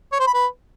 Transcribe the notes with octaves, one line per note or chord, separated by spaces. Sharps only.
C#5
C5
B5
B4